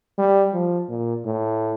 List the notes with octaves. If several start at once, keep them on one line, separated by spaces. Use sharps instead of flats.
G3
F3
A#2
A2